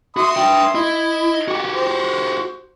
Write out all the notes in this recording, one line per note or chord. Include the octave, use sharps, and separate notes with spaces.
F#4 E5 C6 D#6
D4 G5
E4 D#5
F#4 G4
C5